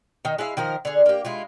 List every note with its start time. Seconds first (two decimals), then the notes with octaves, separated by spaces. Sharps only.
0.25 D#3 D#4
0.38 G#3 E4 F5
0.57 D#3 F3 A#4
0.85 D3 G#4
1.06 A#3 G4
1.25 G#3 E4 F4